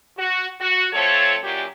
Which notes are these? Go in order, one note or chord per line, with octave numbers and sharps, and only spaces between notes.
F#4
F#4
F3 A3 C4 A4 C#5
F#2 A#2 G4